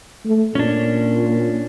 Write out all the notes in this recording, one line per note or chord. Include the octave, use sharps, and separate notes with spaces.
A3
A#2 C#4 D4